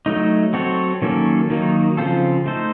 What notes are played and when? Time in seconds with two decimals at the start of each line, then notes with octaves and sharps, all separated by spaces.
0.06 F#3 A3 D#4
0.53 F#3 C4 F#4 A4 C#5
1.02 D#3 F#3 A#3 C#4 A4
1.50 D#3 F#3 A#3 D#4
1.97 C#3 F3 C4 F4 A4
2.46 A3 D#4 A4 C5